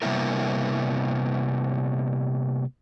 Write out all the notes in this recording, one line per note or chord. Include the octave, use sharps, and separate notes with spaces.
C3 G3 A#3 B3 E4 A#4